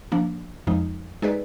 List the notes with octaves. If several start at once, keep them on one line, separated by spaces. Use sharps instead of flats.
F3 A#3 D4
F2 F3 G#3 D#4
G#3 D#4 G#4 B4 D5